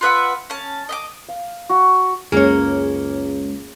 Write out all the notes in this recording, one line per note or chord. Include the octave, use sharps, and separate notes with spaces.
F4 B4 E5 F#5
C#4 A5
D#5 E5 D6
F5
F#4
C#2 F#2 G#3 A#3 C#4 G#4 C#5